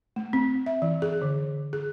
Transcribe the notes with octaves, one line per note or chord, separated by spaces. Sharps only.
A3
C4
E5
E3
G#4
D3
G#4